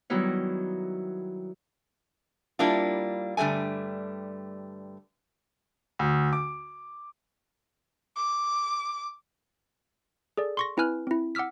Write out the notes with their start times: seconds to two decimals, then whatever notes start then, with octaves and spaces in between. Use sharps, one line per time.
0.10 D#3 F#3 G3 B3 D#4 E4
2.59 G3 A#3 D4 E4 F4
3.37 G2 D3 G3 A3 G#5
5.99 D2
6.33 D6
8.16 D6
10.37 G#4 A4 D5
10.57 C6 C#6 A#6
10.77 C4 E4 B4 G#5 F6 F#6
11.07 C4 E4
11.35 F#5 D6 E6 F6 B6